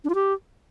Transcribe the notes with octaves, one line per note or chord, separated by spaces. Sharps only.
D4
F4
G4